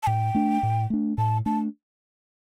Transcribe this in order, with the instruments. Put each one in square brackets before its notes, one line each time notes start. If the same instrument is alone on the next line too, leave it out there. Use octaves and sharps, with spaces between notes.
[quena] A5
[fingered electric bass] A2 [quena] G5
[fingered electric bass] A3 D4
A2
A3 D4
[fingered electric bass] A2 [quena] A5
[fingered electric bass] A3 D4 [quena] A5